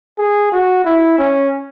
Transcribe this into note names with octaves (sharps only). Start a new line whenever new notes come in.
G#4
F#4
E4
C#4